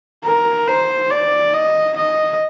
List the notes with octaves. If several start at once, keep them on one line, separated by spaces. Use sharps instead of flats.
A#4
C5
D5
D#5
D#5